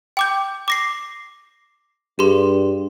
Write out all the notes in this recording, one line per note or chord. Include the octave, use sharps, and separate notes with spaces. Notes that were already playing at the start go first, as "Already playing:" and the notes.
G5 D6 G6
D6 A#6 C7
G2 G4 G#4 C6